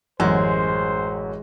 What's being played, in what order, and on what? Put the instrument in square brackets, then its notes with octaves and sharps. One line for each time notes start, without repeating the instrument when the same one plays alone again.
[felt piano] A1 [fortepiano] F#2 [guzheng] G#3 [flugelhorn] C5